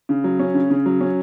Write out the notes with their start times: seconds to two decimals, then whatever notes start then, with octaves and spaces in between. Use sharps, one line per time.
0.09 C#3
0.24 F#3
0.39 C#4
0.54 C#3
0.70 C#3
0.86 F#3
1.01 C#4